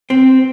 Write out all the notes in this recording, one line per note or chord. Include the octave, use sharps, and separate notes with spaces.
C4